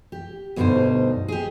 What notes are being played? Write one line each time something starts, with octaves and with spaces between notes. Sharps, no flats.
G4
D2 G2 B2 G3 D#4 C5
G4 G#4